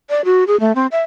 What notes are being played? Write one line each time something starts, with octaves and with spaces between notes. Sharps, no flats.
D5
F#4
G#4
A3
C4
E5